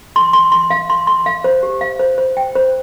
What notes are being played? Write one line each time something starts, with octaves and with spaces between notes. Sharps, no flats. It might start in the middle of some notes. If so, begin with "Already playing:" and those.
C6
C6
C6
F5
C6
C6
F5
C5
G4
F5
C5
C5
G5
C5